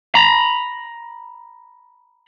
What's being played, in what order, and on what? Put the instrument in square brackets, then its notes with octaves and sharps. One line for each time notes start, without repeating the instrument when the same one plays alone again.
[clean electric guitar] A#5 B5